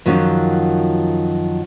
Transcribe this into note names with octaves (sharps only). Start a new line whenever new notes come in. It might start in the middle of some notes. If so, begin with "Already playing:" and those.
F#2 D#3 F3 F#3 C#4